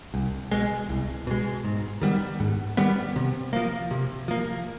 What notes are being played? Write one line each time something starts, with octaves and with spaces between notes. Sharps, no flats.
C2
B2 G#3
C2
B2 G#3
G#2
D#3 G3 B3
G#2
D#3 G3 B3
C3
F3 A#3
C3
F3 A#3